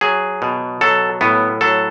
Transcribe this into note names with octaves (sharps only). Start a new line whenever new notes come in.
F#3 G#4
B2
F#3 A4
A2 B3
F#3 A4